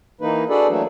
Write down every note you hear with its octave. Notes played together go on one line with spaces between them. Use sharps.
E3 A#3 D#4 B4
D4 F#4 G#4 A4 B4 D5
E3 F#3 A3 A#3 D4